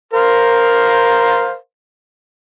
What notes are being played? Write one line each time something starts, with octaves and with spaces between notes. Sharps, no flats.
A#4 C5 F5